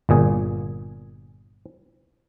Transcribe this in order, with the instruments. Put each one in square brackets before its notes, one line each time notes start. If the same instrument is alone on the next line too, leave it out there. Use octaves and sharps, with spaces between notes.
[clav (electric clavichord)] G1 A#2 G#4